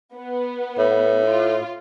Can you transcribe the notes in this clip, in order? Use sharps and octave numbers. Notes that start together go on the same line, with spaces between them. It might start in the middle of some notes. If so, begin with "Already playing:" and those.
B3
A2
F4